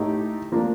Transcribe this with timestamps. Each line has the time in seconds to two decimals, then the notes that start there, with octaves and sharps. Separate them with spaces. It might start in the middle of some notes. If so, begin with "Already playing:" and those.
Already playing: A2 A3 D#4 G4
0.52 F3 A#3 D4